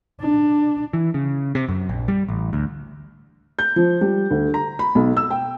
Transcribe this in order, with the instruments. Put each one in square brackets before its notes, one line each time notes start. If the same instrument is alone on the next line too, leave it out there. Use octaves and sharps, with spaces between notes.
[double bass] D4
[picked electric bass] E3
C#3
C3
F#2
A#1
G3
A1
D2
[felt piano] G6
F3
G3
D2
A#5
B5
B1
E6
G5